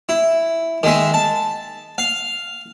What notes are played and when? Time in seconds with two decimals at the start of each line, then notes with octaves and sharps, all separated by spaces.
0.09 E4
0.83 D#3 G#3 E5
1.14 A5
1.98 F5